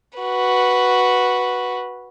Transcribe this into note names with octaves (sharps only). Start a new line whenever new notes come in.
F#4 B4